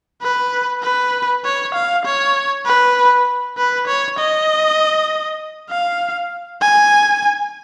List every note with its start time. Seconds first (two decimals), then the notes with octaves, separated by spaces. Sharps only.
0.22 B4
0.83 B4
1.45 C#5
1.74 F5
2.05 C#5
2.65 B4
3.57 B4
3.87 C#5
4.19 D#5
5.70 F5
6.62 G#5